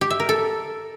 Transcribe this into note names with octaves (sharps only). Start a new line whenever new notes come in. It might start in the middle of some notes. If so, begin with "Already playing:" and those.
G4
E5
A#4
A4